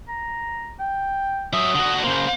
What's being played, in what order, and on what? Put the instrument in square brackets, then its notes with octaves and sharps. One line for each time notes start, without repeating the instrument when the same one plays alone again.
[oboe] A#5
G5
[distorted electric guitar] F#3 E5 [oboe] D#6
[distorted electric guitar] D3 F#4
[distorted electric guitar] C#3 A#3 [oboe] C5